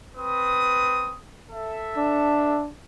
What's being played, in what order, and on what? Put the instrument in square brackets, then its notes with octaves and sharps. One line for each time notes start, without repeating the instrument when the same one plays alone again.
[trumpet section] C4 B4 D#6
A4 E5
[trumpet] D4